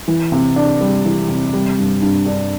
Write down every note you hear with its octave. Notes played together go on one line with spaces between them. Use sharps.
E3
C3
D4
G3
E3
C3
G3
G2
G2
D4